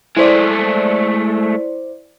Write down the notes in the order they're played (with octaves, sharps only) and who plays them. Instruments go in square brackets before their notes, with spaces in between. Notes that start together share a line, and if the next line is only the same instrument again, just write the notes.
[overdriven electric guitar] G#3 A3 [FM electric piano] E4 C5 D5